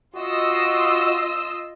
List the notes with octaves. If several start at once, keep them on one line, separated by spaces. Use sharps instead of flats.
F4 F#4 D#5 E6